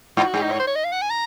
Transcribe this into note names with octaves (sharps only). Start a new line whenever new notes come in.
G#2 F4
F#4
G#2 G#4
D#4
C#5
C5
C#5
D#5
F5
F#5
G#5
A#5